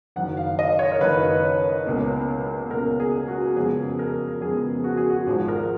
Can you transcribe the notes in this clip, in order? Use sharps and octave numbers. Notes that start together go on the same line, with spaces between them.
F#1 F#2 D#3 F#5
F5
D#5
C#5
A#4
F#1 F#2 D#3 B4
C#2 B2 A#3 C#4
C#2 B2 A#3 C#4 A#4
G#4
F#4
F2 C#3 G#3 B3 G#4
A#4
F2 C#3 G#3 B3 G#4
F#4
G#4
F#4
G#1 G#2 F3 G#4
A#4